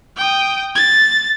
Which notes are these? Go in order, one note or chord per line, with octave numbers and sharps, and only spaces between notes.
G5 D#6
A6